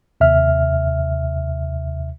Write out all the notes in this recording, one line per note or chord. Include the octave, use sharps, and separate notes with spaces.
D#2 C3 E5 F6